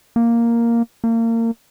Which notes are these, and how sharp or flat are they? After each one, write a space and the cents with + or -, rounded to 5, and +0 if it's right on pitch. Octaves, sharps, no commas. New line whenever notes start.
A#3 +0
A#3 -30